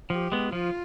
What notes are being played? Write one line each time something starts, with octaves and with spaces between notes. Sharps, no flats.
F3 G4
G#3 B3
F3 F4